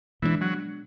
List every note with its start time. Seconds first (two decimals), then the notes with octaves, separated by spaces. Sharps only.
0.22 B2 E3 G#3 B3 D4
0.41 F#3